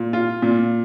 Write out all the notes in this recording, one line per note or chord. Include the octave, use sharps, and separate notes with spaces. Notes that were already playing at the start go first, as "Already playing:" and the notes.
Already playing: A#2
F4
A#2